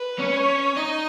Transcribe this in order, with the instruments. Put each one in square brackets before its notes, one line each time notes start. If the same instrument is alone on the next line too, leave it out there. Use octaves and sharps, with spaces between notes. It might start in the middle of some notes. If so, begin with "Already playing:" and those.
Already playing: [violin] B4
[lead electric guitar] C#4
[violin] C#5
[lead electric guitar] D#4 [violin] D#5